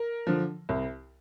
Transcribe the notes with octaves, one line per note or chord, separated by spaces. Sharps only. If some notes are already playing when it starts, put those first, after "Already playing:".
Already playing: A#4
D3 F3
C2